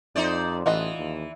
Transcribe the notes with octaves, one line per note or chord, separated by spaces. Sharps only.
F2 D#4 C5 D5
A1 E3 F4 D#5 F#5
D#2